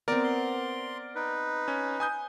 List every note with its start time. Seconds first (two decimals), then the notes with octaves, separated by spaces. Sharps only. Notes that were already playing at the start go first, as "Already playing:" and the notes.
0.08 B3 C4 A#4 D5
0.24 C6
1.15 D#4 B4
1.68 C#4
2.00 G#5 D#6 G6